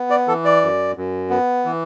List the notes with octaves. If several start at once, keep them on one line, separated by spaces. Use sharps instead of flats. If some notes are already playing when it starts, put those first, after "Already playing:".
Already playing: B3
D5
E3 A4
D5
F#2
F#2
B3
E3